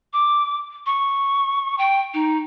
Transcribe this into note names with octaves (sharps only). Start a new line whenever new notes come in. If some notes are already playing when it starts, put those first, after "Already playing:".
D6
C#6
G5
D#4